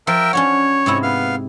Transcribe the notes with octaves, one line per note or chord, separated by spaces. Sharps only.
F3 A#4 E5 G5
C#4 D4 F#4 C#5
G#2 C3 E4
B3 F5